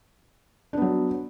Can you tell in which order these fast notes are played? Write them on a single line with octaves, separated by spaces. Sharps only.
D4 B3 F#3